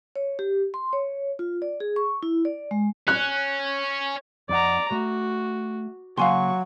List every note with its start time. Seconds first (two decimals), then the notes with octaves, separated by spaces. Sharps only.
0.16 C#5
0.39 G4
0.74 C6
0.93 C#5
1.39 F4
1.62 D5
1.80 G#4
1.96 C#6
2.23 E4
2.45 D5
2.71 G#3
3.08 C#4 F#6
4.49 F2 D#4 D5 F#5 A#5
4.92 A3 F#4
6.18 C#3 F#3 A#3 F#4 F5 G#5 C6 C#6